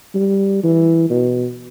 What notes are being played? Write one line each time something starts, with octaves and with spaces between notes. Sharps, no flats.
G3
E3
B2